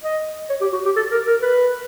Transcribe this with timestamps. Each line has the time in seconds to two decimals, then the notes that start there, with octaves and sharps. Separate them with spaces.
0.04 D#5
0.50 C#5
0.61 G4
0.73 F#4
0.85 G4
0.96 A4
1.12 A#4
1.27 A#4
1.42 B4